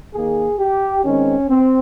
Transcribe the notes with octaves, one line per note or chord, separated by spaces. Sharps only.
D#3 A#3 G#4
G4
D#3 G#3 C4 C#4
C4